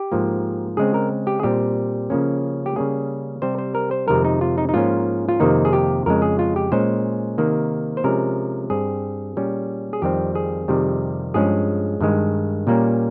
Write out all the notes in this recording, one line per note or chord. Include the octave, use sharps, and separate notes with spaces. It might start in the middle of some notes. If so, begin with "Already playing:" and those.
Already playing: G4
G#2 F3 A#3
C#3 G#3 C4 G#4
A#4
G4
G#4
A#2 G3 C4 G4
C#3 F3 A#3 C#4
G4
C#3 G3 A#3 C#4 G#4
C3 G3 C4 C5
C5
A#4
C5
F2 C3 D#3 G#3 A#4
D#4
F4
D#4
D#4
G#2 F3 A#3 C#4 F4
F4
F2 C3 D#3 A#3 D#4
G#4
G4
F2 C#3 G#3 A#4
G#4
F4
G4
A#2 G#3 C#4 C5
C3 D#3 A#3
C5
C3 F3 G#3 C#4 A#4
G2 G3 C4 G#4
A#2 G3 C#4
G#4
F2 D#3 G3 C4 G4
G#4
F2 C3 D#3 G3
G2 F3 G#3 C#4 G#4
G2 D#3 G#3
A#2 G3 A#3 C#4